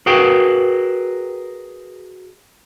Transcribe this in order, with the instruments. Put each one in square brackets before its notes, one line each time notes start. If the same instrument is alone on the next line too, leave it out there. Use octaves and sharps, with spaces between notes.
[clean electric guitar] F#4 G#4 A#4 B4 G5